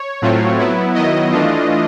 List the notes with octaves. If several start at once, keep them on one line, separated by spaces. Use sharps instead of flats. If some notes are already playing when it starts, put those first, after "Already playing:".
Already playing: C#5
A2 F#3 A3 C4 F4
F#3 B3 E4
D#3 F#3 B3 E4 D#5
E3 A3 D4 F4